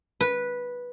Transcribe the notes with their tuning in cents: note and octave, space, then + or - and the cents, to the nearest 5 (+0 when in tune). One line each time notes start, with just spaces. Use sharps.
B4 -10